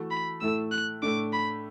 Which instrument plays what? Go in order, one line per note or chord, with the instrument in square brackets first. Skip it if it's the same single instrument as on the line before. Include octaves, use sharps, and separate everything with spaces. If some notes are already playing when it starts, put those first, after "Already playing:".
Already playing: [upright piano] E3 A3 F#4 A4
[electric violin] B5
[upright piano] A2 A3 E4 A4 [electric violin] E6
[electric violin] F#6
[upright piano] A2 A3 D4 [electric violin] D6
[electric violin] B5